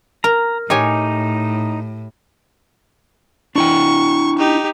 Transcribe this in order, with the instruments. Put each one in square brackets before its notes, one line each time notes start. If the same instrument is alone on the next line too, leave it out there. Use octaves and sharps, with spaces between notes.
[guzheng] A#4 [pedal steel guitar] A#5
[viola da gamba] A2 [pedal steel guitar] D#4 [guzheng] G4 C#5 G#5
[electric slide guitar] D4 E4 G5 [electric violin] C#6
[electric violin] D#4 G4